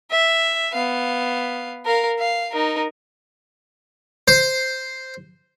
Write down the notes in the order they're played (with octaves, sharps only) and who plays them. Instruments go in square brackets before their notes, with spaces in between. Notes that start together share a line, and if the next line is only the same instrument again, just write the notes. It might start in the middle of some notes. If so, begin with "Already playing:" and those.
[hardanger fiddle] E5
B3 F5
A#4 F5
F5
D#4 A#4
[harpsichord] C5